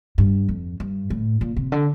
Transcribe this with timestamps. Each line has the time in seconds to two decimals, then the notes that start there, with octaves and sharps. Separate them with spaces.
0.18 G2
0.49 F2
0.80 G2
1.10 A2
1.41 A#2
1.57 C3
1.72 D3